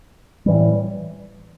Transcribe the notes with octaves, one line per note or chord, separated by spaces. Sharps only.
A2 E3 G3